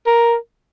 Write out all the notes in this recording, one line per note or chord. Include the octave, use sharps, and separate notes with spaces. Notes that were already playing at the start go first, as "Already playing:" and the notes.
A#4